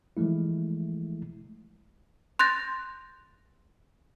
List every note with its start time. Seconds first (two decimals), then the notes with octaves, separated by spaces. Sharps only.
0.17 E3 F3 G#3 A3 E4
2.39 C6 F#6 G6 A6 A#6